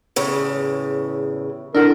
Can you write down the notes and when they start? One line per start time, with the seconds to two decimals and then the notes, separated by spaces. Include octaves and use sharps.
0.16 E2 A2 C#3
1.75 D4 E4 A4 A#4 F#5